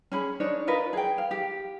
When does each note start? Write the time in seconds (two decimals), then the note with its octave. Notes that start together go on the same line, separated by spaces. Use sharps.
0.12 C#4 G#4 B5
0.40 D4 D#4 C#5
0.67 F4 A#4 B4 D#5
0.93 G#4 G5
1.18 F5
1.31 G4